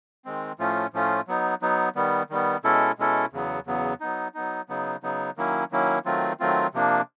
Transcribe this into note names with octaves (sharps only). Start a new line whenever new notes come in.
D#3 G#3 C4
A2 F3 A3 C#4 F4
A2 F3 A3 C#4 F4
F#3 B3 D#4
F#3 B3 D#4
D#3 G3 B3
D#3 G3 B3
B2 G#3 C#4 E4 A4
B2 G#3 C#4 E4 A4
E2 C#3 F#3 B3
E2 C#3 F#3 B3
F#3 B3 D#4
F#3 B3 D#4
C#3 F#3 B3 D#4
C#3 F#3 B3 D#4
D#3 F#3 A#3 C#4 E4
D#3 F#3 A#3 C#4 E4
D#3 F#3 A3 C4 F4
D#3 F#3 A3 C4 F4
C3 F3 A#3 D4